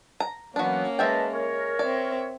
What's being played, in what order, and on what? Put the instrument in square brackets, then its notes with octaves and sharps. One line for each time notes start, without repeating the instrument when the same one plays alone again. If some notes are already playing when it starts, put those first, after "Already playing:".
[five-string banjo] A#5
[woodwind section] E3 F#3 B3 [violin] A#3 C#4 [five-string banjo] D4 F#4
[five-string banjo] G#3 E5 G5 [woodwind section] B4 D#5 A5
[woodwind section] A#4 C#5
[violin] C4 E5 [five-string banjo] D5